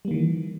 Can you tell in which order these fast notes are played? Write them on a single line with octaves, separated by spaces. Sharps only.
G3 A#3 D#3 E3